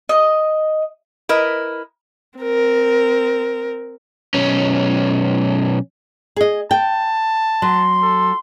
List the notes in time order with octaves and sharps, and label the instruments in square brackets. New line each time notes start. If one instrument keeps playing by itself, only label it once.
[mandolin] D#5
[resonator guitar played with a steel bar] E4 A#4 B4 D#5
[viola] C4 A#4
[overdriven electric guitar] B1 C#4
[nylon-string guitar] G#4 D#5
[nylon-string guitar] G5 [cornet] A5
[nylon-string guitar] F#3 [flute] C6
[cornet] A4